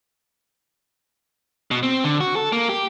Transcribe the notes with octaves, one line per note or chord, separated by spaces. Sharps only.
B2
C4
D3
F#4
A4
A#3
G4